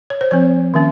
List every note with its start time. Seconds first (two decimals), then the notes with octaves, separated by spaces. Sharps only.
0.10 C#5
0.21 C5
0.31 F3 C4 C#5
0.74 D#3 A#3 C#4